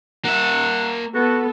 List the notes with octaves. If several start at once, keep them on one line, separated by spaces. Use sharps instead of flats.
A#3 E5 F#5
B3 F#4 A4